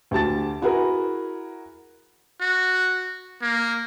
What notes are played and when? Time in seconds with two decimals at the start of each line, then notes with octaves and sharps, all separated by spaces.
0.11 D2 G4 A5 A6
0.62 E4 F#4 G#4 A#4 B4
2.41 F#4
3.42 A#3